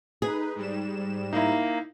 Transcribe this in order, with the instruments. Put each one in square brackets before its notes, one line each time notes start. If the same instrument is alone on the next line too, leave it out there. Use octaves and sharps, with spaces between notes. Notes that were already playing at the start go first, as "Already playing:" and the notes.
[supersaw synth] D#4 B4 [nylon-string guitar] G#4
[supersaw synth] G#2 G3 E7
[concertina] A#3 [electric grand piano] D#4 E4